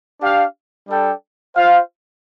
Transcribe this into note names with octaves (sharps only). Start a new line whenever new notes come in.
D4 G4 F5
G3 D4 A4 D5 G5
F4 C5 F5